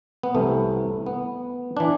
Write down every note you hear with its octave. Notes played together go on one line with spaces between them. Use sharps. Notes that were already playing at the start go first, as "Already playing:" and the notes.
B3
C2 C3 E3 A3
B3
E3 D4